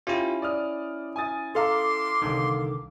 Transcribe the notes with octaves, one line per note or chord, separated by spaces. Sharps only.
C#4 E4 F4 G4
D5 D#6 F6
G#5 D#6 A6
A4 F5 A#5 C6 D6
C2 D3 D#3